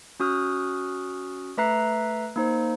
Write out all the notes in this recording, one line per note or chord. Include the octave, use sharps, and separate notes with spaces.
C#4 F#4 D#6 F6 F#6
A3 B4 E5 A#5 F#6 C7
A#3 D#4 C5